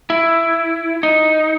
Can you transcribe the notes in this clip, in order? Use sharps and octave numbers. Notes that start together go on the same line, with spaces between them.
E4
D#4